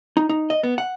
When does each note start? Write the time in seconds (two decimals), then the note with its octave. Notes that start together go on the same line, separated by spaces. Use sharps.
0.17 D#4
0.29 D#4
0.50 D#5
0.63 B3
0.78 F#5